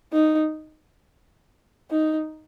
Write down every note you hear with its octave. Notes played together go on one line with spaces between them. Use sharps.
D#4
D#4